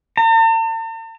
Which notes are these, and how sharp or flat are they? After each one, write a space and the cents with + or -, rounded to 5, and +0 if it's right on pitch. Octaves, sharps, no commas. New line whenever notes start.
A5 +45